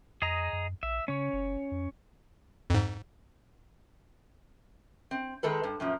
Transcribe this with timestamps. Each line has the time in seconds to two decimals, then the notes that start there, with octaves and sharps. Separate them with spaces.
0.22 F2 G#4 D#5 A#5
0.53 F#2
0.83 A#1 E5
1.08 C#3 C#4 C#5
1.33 F#1
1.72 F2
2.70 F2 G#2
5.11 C4
5.43 D#3 G#3 A4 B4
5.63 G2
5.80 F#2 A#2 F3